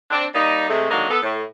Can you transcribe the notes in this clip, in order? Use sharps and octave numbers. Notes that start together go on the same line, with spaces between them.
C4 D4
G3 A#3 D#4
C3 G#3 A3
D3 D#3 F#3 G#3 A#3
B3 A4
A2